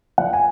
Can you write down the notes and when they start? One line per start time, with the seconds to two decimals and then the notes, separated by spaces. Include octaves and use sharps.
0.18 F3 F#5
0.33 G#5